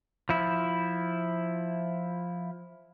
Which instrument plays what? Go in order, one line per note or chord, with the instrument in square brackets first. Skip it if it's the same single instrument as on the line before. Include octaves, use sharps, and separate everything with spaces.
[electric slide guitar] F3 E4